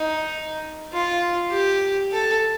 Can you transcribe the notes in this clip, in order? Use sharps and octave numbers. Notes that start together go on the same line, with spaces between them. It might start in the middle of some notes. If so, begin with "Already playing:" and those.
Already playing: D#4
F4
G4
A4